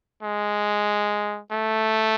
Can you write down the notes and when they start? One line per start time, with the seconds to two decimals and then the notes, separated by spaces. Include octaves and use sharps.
0.23 G#3
1.52 A3